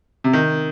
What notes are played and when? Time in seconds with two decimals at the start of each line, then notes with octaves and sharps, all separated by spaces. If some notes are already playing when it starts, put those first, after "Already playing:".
0.24 C3
0.33 D#3